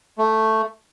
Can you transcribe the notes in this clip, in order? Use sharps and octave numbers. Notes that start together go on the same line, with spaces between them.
A3